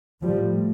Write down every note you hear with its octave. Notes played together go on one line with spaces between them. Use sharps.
A2 F3 G3